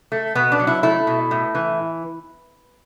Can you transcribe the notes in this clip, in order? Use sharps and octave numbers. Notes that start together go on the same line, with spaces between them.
A3
B2 B3
D4
F#3
E4
A3 E4
B2
A2
E3